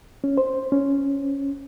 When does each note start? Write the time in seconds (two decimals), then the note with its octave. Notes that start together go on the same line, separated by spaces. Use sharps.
0.24 C#4
0.38 C5
0.72 C#4